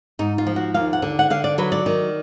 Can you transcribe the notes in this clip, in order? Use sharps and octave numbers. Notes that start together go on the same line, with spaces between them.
G#2 D#4
F4
F3
F#4
D#2 F5
F#5
D3
F#5
D3 F5
D5
F#3 B4
D5
D#3